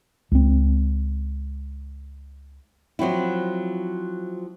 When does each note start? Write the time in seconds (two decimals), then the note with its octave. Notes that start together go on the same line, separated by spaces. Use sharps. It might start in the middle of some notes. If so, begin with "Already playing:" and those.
0.32 C#2 C4
2.99 F3 F#3 C4 E4